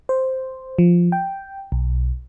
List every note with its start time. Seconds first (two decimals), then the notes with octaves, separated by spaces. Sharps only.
0.09 C5
0.78 F3
1.12 G5
1.72 B1